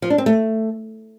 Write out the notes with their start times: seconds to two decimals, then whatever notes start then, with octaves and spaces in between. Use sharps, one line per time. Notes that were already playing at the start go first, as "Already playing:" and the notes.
0.02 F3
0.10 D4
0.18 C4
0.26 A3